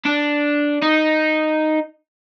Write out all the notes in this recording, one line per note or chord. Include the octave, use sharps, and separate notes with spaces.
D4
D#4